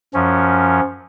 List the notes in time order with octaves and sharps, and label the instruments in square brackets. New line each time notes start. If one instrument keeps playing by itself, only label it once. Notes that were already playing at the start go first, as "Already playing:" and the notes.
[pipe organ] F#2 F3 C#4